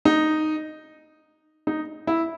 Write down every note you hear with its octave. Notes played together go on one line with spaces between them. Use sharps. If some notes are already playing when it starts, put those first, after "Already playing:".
D#4
D#4
E4